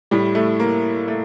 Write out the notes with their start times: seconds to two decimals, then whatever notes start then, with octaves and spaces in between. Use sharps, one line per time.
0.11 A2 G3
0.35 A3
0.60 A#3
1.08 A3